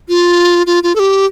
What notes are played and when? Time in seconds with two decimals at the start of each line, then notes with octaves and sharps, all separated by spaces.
0.09 F4
0.67 F4
0.83 F4
0.95 A4
0.99 G4